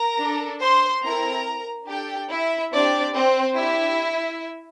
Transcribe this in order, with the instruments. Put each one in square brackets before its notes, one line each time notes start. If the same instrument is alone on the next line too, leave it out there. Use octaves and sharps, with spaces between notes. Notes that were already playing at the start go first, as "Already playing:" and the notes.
Already playing: [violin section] A#4 A#5
D4 A4
C5 C6
C4 E4 A4 A#4 A#5
D4 G4 A4 G5
E4 E5
C4 D4 G4 D5
C4 C5
D4 E4 G4 E5